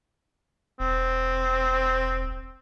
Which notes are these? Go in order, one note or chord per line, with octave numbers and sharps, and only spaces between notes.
E1 C4